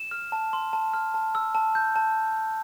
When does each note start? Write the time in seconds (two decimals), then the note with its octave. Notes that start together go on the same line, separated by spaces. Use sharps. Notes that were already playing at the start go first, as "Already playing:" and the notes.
Already playing: E7
0.11 F6
0.32 A5
0.53 C6
0.73 A5
0.94 F6
1.14 A5
1.35 E6
1.55 A5
1.75 G6
1.96 A5